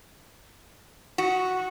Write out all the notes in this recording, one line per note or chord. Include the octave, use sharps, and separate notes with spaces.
F#4